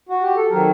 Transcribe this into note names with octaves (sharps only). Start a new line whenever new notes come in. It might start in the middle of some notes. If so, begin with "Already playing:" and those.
F#4
G4
A4
D#3 F#3 C4 A#4